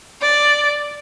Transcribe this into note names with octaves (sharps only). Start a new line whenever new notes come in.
D5